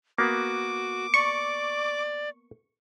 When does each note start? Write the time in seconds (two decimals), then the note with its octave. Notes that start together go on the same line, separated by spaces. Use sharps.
0.18 A#3 B3 F#4 D6
1.14 D5 C#6